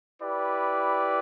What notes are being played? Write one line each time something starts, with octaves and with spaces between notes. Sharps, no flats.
E4 G4 B4 D5